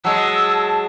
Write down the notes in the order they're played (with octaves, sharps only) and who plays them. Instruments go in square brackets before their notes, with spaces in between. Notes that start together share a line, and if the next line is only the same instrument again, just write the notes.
[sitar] F#3 G#3 [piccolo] A5 [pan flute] E6